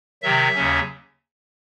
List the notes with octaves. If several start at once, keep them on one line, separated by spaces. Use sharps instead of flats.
C3 D#3 F#3 E5
D#2 C#3 F#3 C#4